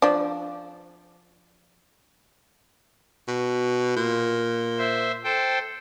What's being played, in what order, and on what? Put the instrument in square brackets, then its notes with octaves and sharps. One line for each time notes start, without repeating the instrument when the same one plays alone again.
[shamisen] F3 D4
[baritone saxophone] B2
A#2
[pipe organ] C5 E5
A4 C5 G5